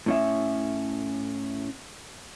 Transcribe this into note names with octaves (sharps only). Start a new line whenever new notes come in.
A2 C#4 E5